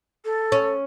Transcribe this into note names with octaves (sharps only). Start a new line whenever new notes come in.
A4
C#4